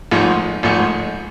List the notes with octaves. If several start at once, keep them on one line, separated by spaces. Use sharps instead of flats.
G#1 G#2 F3 A3
G#1 G#2 F3 A3